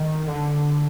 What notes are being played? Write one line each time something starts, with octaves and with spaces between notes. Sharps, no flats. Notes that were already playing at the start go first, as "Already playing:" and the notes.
Already playing: D#3
D3